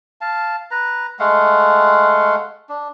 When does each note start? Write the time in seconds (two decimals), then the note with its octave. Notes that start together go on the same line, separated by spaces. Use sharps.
0.21 F5 A5
0.71 B4 A#5
1.19 G#3 A3 F5 F#5
2.69 D4